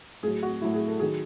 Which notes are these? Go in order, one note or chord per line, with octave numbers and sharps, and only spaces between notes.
A2 F#3 G#4
F#4
A2 F#3 E4
G#4
A4
D#3 F#3 G#4